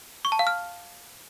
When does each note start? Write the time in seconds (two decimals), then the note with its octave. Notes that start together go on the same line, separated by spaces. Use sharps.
0.25 C#6
0.32 A5
0.39 F5
0.47 F6